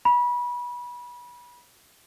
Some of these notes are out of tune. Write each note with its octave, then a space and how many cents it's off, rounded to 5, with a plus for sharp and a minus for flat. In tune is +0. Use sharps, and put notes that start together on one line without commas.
B5 -25